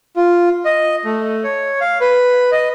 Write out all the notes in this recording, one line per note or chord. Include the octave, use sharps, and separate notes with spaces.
F4
D#5
A3
C#5
F5
B4
D#5